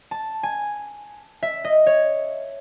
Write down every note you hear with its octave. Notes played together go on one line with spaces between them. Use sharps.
A5
G#5
E5
D#5
C#5